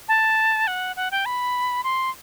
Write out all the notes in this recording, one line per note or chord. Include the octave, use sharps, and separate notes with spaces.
A5
F#5
F#5
G5
B5
C6